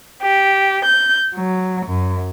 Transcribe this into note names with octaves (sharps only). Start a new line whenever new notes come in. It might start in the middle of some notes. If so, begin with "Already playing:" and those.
G4
G6
F#3
F#2